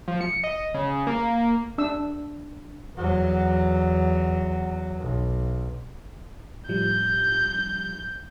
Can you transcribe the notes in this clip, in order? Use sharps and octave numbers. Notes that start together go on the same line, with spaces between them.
F3
C#7
D#5
C#3
A#3
D4 E6
E2 F#3
B1
A2 F3 G3 G6